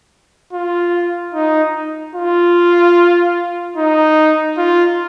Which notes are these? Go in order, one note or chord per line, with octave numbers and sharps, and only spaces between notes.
F4
D#4
F4
D#4
F4